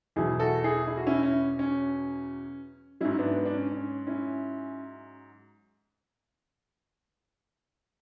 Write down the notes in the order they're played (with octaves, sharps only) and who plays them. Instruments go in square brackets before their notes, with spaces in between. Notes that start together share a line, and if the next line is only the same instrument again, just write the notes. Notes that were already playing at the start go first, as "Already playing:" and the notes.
[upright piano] E2 B2 F#3 E4 G#4
F#4 A4
E4 G#4
E4
F#4
C#4 E4
C#4
C#4
G#2 F#3 C#4 E4
B3 D4
B3
D4
C#4
C#4
C#4 E4